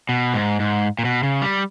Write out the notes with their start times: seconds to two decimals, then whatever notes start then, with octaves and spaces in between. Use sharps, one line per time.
0.09 B2
0.34 G#2
0.60 G#2
0.99 A#2
1.05 B2
1.23 C#3
1.42 G3